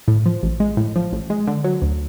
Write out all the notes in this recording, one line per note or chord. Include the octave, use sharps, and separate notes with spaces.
A2
F3
A1
G#3
A2
F3
A1
G#3
D3
F#3
D2